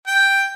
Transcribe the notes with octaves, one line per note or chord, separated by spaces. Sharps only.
G5